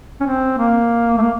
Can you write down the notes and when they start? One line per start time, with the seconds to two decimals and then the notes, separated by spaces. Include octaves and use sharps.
0.21 C#4
0.26 C4
0.58 A#3
1.18 A3
1.22 A#3